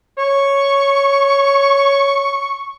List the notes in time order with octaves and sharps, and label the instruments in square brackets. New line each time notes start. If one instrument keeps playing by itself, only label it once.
[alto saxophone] C#5 [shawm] C#6